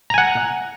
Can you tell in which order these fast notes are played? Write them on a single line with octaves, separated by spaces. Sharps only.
A#5 G#5 F#5